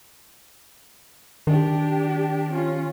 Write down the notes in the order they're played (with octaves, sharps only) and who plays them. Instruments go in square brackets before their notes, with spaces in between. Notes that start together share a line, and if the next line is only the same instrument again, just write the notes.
[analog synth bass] D#3 [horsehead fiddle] D4 G4
[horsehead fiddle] C#4 F4